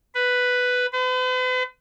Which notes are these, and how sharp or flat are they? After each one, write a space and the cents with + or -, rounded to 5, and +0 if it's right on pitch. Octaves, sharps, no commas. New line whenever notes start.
B4 +5
B4 +45